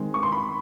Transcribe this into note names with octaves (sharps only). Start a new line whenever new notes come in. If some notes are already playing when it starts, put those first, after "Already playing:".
Already playing: D#3 G#3 C4
C#6
C6
B5